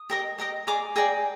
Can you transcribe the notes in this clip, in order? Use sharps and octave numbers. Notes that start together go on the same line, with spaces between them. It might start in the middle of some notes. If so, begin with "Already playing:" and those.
Already playing: D#6
G4 A#4 D#5
G4 A#4 D#5
G#4 D5 A#5 D6
G#4 D5 G5 A#5